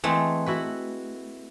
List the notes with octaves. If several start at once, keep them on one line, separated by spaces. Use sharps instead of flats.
E3 G#3 A3 C4
E4 F#4 B4